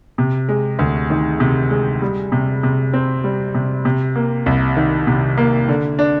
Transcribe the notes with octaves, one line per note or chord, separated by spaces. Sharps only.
C3
G#3
D2
D#3
C3
G#3
G3
C3
C3
C4
G3
C3
C3
A#3
C2
D#3
C3
A#3
D3
D4